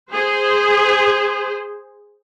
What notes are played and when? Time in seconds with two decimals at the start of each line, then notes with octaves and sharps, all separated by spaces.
0.12 G#4 C5